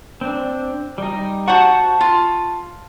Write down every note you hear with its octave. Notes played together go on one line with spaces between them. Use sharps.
C4 D4
G3 D#4
F#4 C5 F#5 A5 C#6
F4